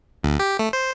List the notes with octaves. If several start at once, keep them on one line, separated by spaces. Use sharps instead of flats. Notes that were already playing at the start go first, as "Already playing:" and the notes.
D2
G4
A3
C5